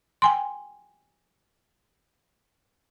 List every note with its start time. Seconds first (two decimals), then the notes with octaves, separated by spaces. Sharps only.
0.22 G5 G#5 C6